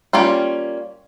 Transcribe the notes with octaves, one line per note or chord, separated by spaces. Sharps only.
G3 A#3 C#4 F4